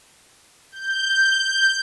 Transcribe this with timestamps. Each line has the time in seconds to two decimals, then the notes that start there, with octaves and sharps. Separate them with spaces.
0.72 G6